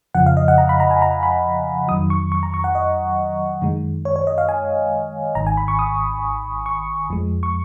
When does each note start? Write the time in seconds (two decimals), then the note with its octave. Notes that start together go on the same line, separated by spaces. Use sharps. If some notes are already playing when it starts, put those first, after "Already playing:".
0.15 F2 C#3 F3 F#5
0.26 F5
0.37 D#5
0.48 F#5
0.58 A#5
0.69 B5
0.80 A#5
0.91 G#5
1.02 A#5
1.23 B5
1.88 F2 D#3 F#3 D#6
2.10 C#6
2.32 C#6
2.43 A#5
2.54 C#6
2.64 F#5
2.75 D#5
3.62 F#2 D#3 G#3
4.05 C#5
4.16 C#5
4.27 D#5
4.38 F5
4.49 G#5
5.35 G#1 G#2 D#3 A#5
5.47 G#5
5.57 B5
5.68 C#6
5.79 D#6
6.66 C#6
7.10 F2 F3 G#3
7.43 C#6